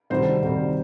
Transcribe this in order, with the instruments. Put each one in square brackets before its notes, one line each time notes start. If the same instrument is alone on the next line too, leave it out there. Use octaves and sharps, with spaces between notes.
[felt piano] D2 C3 D#3 G3 C4 C5
D2 C3 D#3 G3